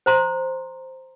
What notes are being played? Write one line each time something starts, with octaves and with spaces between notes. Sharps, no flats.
C5 A#5 C6